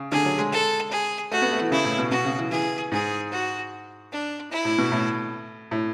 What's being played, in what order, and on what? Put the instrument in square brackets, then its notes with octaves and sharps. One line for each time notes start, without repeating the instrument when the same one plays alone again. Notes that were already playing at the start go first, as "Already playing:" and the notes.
Already playing: [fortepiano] C#3
[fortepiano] D3 [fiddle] G#4
[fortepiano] F#3
G#3
[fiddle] A4
G#4
[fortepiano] A3 [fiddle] F#4
[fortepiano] B3
A3
E3
[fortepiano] C#3 [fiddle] E4
[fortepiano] A2
B2
[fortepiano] B2 [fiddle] F#4
[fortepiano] C#3
E3
[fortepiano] E3 [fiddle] G#4
[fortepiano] G#2 [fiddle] G#4
[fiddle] F#4
D4
E4
[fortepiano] A2
B2
A2
A2